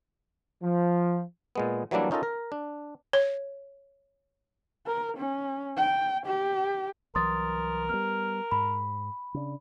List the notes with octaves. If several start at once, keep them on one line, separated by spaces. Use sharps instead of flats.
F3
A#2 G#3 B3
E3 F#3 G3 A#3 D4 E4
C#4 D#4 F4 A4 A#4
A#4
D4
C#5
A#4
C#4
G5
G4
C2 E3 F#3 A#4 C6 D#6 A6
G3 A3 B3 F6
G#2 B5
C#3 D4